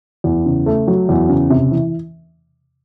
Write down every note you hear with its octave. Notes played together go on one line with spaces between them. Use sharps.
E2
C#3
A3
F#3
E2
C#3
C3
E3